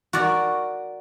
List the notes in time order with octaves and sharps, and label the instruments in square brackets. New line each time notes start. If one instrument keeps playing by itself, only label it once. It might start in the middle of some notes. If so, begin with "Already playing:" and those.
[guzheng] F#4 A#4 D5